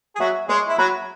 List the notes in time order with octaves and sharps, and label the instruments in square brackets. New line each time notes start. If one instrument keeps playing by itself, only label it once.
[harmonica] G#4
[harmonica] F#3 F#4 [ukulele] E5
[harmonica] G#3 G#4 [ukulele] C#5
[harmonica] E4
[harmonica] F#3 F#4 [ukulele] B5